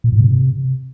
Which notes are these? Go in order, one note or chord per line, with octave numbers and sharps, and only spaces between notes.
A#2
G#2
C3